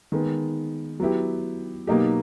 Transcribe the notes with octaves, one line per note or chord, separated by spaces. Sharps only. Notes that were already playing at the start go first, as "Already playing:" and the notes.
D#3 G#3 B3
F#3 B3 E4 G4
B2 F#3 A#3 D#4 G4